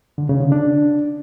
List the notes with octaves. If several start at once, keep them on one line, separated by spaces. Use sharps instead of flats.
D3
C#3
D3
D4